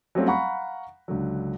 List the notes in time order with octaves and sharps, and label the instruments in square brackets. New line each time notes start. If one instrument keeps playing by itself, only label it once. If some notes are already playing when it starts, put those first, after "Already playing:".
[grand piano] F#3 G3 A3 C4 C#4 F4
F5 F#5 A#5 B5 C#6
C#2 D3 F#3